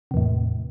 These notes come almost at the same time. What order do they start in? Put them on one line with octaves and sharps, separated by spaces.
C3 E2 A2